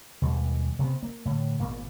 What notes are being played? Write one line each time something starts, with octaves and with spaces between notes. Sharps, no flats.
D#2 B2 G3 G#3
C3 A3 B3
A#3
A2 D3
G#1 A#2 A#3 B3